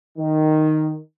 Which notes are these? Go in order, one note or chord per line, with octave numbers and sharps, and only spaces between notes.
D#3